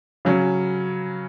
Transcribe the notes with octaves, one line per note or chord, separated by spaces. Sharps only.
C#3 F#3 C#4